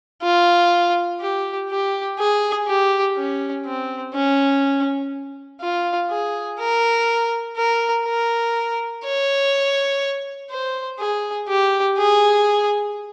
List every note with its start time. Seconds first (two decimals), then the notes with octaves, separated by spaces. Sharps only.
0.23 F4
1.21 G4
1.70 G4
2.18 G#4
2.67 G4
3.17 C#4
3.65 C4
4.14 C#4
5.61 F4
6.10 G#4
6.59 A#4
7.57 A#4
8.06 A#4
9.04 C#5
10.50 C5
10.99 G#4
11.48 G4
11.97 G#4